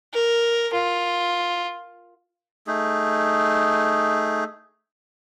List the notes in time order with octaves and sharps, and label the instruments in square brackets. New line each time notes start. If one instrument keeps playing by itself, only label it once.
[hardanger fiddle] A#4
F4
[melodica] A3 D#4 G#4